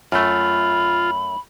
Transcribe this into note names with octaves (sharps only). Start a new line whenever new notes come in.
F#2 A3 F4 B5